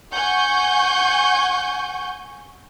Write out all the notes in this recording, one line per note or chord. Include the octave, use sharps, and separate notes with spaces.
F#5 G#5 C#6 G6